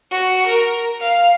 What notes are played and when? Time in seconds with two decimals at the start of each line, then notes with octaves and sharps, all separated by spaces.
0.11 F#4
0.47 A#4
1.00 F5